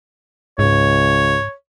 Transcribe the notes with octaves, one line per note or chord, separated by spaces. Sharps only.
C#2 G#2 C#5